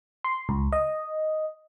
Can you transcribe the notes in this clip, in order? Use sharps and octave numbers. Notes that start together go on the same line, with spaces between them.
C6
C#2
D#5